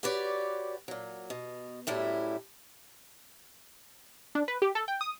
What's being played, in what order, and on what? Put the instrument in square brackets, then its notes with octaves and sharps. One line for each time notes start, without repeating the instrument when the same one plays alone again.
[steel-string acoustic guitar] F#4 G4 B4 C#5 D5
A#2 F#3
B2
F#2 A2 G3 E4
[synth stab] D4
B4
G4
A4
G5
D#6